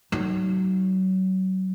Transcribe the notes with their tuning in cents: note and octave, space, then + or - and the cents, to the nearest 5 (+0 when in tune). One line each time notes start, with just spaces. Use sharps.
F#3 +25 D#4 +0